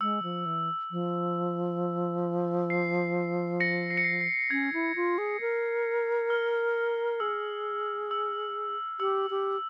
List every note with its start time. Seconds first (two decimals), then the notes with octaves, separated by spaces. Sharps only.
0.01 G#3 E6
0.23 F3
0.46 E3
0.91 F3
2.70 C7
3.60 A#6 C#7
3.90 C7
3.97 C#7
4.04 C7
4.21 C7
4.50 C#4 G#6
4.73 E4
4.95 F4
5.18 G#4
5.41 A#4
6.30 F6
7.20 G#4 E6
8.11 E6
9.00 G4 E6
9.30 G4